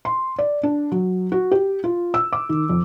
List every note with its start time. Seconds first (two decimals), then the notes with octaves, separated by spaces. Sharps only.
0.05 C6
0.39 D5
0.63 D4
0.92 F#3
1.32 F#4
1.51 G4
1.84 F4
2.14 E6
2.33 D6
2.49 D#3
2.69 F2